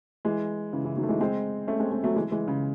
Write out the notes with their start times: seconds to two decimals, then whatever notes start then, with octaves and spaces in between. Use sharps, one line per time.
0.25 E3 G#3
0.73 C#3 E3
0.85 C#3 E3
0.96 D#3 F#3
1.03 A3
1.08 E3 G#3
1.21 G#3 C4
1.67 A3 C#4
1.80 G#3 C4
1.91 G#3 C4
2.03 F#3 A3
2.15 E3 G#3
2.31 E3 G#3
2.48 C#3